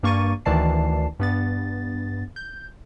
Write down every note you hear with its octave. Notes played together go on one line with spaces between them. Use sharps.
G2 A#3 C#6 A6 D#7
D2 D#3 E3 D5 A5 C7
G2 B3 A6
G6